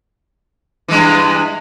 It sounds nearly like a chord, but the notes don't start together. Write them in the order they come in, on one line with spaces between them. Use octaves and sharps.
E3 G#3 G2